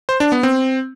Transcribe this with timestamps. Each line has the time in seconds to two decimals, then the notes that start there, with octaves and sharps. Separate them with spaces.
0.09 C5
0.20 D4
0.32 B3
0.43 C4